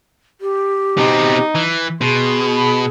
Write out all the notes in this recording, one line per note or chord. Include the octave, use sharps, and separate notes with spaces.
G4
B2 C4 D#4
E3
B2 G#4 C6
B5